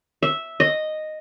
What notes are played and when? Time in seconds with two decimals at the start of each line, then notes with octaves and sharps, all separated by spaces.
0.23 E5
0.60 D#5